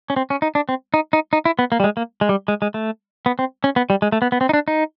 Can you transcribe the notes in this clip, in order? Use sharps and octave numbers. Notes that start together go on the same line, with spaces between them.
C#4
C4
C#4
D#4
D4
C4
D#4
D#4
D#4
E4
B3
A#3
G3
G#3
A#3
G#3
G3
G#3
G#3
A3
B3
C4
C#4
B3
G3
G#3
A3
B3
B3
C4
D#4
D4
D#4